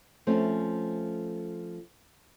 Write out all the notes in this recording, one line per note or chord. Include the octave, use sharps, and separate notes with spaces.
F3 A3 C4 C#4